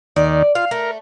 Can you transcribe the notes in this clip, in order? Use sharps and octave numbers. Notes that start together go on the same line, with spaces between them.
D#2 D#3 D5
F4 F5
A3 A#4